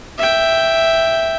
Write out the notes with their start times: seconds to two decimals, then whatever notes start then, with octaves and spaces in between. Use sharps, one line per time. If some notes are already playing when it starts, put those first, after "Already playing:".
0.18 E5 G5